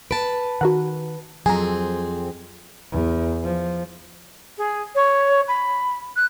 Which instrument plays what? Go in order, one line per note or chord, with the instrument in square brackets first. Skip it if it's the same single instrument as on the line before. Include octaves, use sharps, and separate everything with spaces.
[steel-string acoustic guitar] B4 A5 [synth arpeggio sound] D7
[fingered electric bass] D#3 [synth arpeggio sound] F#4 A#4 F#5
[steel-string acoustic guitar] F2 C4 G#4 [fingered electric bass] F#3 [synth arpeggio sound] G#5 A#5
[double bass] E2
F3
[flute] G#4
C#5
B5
F#6